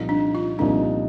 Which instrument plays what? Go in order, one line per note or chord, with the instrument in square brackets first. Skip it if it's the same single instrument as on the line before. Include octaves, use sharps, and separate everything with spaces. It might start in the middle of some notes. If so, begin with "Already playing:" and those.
Already playing: [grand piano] C2 A#2 F3 A#3 D#4
[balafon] D4
F4
[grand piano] C2 A#2 F3 A#3 D#4 [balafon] D4